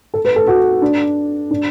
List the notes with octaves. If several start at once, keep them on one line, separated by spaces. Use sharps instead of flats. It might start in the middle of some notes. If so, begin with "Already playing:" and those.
A4
B4
A4
F#4
D4
D4